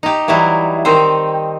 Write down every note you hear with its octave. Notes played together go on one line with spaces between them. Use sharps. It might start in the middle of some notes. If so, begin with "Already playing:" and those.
D#4 G4
E3 F#3 G3 D#4 E4
D#3 C4 D#4 C5